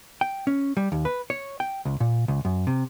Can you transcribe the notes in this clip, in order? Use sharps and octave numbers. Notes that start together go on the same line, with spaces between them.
G5
C#4
G3
D#2
B4
C#5
G5
C#2
A#2
C#2
F#2
C3